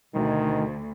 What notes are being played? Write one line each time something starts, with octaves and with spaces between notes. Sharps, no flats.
D2 B2 D#3